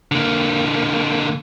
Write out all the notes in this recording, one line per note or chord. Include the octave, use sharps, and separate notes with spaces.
D3 A#3